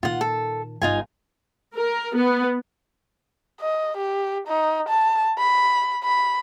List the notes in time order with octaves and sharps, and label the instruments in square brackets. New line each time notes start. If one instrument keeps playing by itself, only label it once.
[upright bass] A#2 D#3 [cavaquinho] F4 F#5
[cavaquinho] A4
[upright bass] G1 [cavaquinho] D#4 F4 G#5
[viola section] A#4
B3
[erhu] D#5
G4
D#4
A5
B5
B5